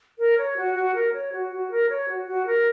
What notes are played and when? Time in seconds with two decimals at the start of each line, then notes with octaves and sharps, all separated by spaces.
0.18 A#4
0.38 C#5
0.57 F#4
0.75 F#4
0.95 A#4
1.13 C#5
1.32 F#4
1.51 F#4
1.71 A#4
1.89 C#5
2.09 F#4
2.27 F#4
2.46 A#4